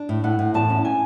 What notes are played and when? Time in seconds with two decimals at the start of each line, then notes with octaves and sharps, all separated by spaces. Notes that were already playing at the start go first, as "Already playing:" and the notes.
Already playing: D4
0.09 A2
0.24 A2 F#5
0.39 A2
0.54 E2 A5
0.70 C#4
0.85 G#5